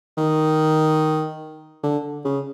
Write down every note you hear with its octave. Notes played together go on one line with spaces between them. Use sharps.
D#3
D3
C#3